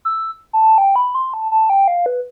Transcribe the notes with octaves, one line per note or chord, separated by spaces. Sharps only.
E6
A5
G5
B5
C6
A5
A5
G5
F5
B4